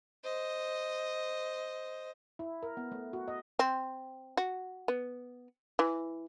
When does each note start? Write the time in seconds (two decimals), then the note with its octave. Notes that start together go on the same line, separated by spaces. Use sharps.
0.24 C5 D#5
2.39 E4
2.63 A#4
2.77 B3
2.92 A3
3.13 F#4
3.28 D#5
3.59 C4
4.37 F#4
4.88 B3
5.79 E3